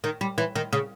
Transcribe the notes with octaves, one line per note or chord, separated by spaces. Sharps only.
D#3
G3
E3
D#3
C#3